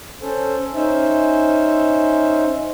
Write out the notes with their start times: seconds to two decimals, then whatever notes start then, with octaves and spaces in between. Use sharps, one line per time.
0.22 C#4 A4 C5
0.75 C#4 D#4 C5 E5